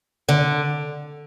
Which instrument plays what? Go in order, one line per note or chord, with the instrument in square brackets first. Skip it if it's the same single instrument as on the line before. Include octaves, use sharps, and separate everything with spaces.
[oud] D3